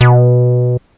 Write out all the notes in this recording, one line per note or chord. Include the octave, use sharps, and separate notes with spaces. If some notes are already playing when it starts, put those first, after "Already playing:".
B2